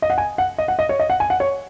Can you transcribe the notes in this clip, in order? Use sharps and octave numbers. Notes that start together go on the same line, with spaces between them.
D#5
F#5
G#5
F#5
D#5
F#5
D#5
C#5
D#5
F#5
G#5
F#5
C#5